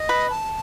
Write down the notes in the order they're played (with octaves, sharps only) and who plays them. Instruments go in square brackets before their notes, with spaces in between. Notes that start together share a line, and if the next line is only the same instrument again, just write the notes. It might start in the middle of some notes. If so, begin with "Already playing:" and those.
Already playing: [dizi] D#5
[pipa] B4
[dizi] A5